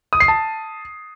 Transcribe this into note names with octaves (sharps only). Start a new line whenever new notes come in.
D#6
C7
A5